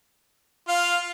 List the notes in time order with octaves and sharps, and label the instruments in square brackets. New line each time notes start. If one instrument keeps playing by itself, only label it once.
[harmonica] F4 [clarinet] F5